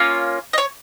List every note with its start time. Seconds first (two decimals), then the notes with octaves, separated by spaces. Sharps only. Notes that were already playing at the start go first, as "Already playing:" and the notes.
Already playing: A#3 C#4 F4
0.53 D#5
0.58 C#5